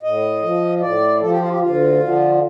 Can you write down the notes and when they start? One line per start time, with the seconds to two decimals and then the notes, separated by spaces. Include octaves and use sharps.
0.03 A2 D#5
0.42 F3
0.81 A2 D5
1.21 F3 A4
1.30 G4
1.40 F4
1.48 G4
1.60 D2 F4
2.00 D3 F3